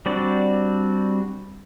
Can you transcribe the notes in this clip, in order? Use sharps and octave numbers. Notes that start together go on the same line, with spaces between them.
G3 C4 D4 F#4 D5